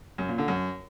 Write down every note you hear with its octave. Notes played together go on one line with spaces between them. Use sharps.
F#2
A#2
D3
F#2